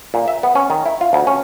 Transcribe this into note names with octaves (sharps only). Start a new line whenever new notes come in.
A#2
E5
B3
C#4
D#3
E4
F4
D2
C#4